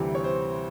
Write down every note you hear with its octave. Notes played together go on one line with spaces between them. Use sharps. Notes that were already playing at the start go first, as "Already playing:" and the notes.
Already playing: D2 C3 E3 G3 G4
C#5
C5